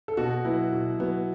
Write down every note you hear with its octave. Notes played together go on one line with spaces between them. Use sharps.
A4
B2 F#4
F#3 B3 E4
B2
F#3 B3